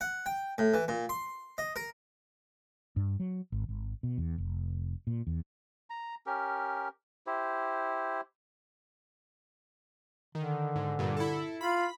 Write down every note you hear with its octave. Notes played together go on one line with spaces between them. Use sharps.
F#5
G5
A2
E3
A#2
C6
D#5
A#4
G2
F#3
G#1
G#1
B2
E2
F1
A#2
E2
A#5
C#4 G4 A#4
E4 G4 C5
D3 D#3
G#2
G2 A#2
E4 A4
F4 B5